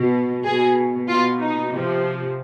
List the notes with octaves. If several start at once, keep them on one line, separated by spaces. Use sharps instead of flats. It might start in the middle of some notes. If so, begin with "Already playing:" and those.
Already playing: B2
B2 G#4
B2 F4
D#4
C3 F3